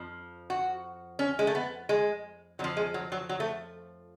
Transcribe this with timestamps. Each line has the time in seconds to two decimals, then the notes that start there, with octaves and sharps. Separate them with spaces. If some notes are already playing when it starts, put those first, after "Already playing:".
Already playing: F2 F3
0.50 F#4
1.19 C#4
1.39 G#3
1.47 A3
1.55 B3
1.89 G#3
2.59 F2 F3 F#3
2.77 G#3
2.94 F#3
3.12 F#3
3.29 F#3
3.40 A3